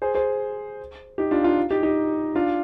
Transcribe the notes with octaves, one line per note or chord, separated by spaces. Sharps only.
G#4 C5
G#4 C5
D#4 G4
D4 F4
D4 F4
D#4 G4
D#4 G4
D4 F4